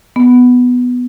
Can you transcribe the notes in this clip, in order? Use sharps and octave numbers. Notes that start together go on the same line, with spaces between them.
B3